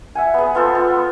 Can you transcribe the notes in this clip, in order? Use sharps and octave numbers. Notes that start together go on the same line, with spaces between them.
E5 F#5 G#5
B3 G#4
B3 F4 A4 C5
B3